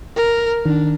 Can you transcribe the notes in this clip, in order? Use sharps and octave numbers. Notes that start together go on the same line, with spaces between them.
A#4
D#3 D4